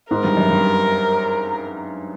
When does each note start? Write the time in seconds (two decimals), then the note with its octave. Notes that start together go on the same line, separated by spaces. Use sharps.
0.11 G#2 A#4
0.24 G2
0.37 F#2
0.50 G2